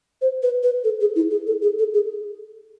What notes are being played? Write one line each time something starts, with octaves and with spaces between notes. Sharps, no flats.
C5
B4
B4
A4
G#4
E4
G#4
A4
G#4
A4
G#4